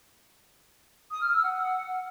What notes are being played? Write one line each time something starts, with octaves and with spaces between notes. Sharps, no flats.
D#6
F6
E6
F#5